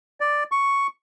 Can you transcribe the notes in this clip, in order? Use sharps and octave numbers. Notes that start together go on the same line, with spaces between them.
D5
C#6